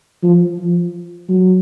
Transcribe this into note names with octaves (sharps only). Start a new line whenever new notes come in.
F3
F3
F#3